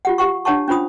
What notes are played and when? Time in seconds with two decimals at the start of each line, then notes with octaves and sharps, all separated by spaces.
0.05 F4 G4 F#5
0.18 G4 F5 F#5 C#6
0.45 D4 C#5 F#5 A5 C#6
0.68 C#4 D4 F4 C5 B5 D#6